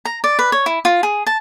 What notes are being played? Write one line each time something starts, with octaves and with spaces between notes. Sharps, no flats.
A#5
D5
B4
C#5
E4
F4
G#4
A5